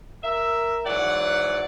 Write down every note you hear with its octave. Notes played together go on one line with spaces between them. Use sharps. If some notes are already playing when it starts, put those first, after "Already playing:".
A#4 E5
G#2 E3 F#3 D5 F#5